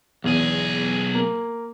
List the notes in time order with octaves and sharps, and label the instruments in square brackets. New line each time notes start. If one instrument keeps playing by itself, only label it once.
[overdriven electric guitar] B1 G#4 [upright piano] E2
[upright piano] A#3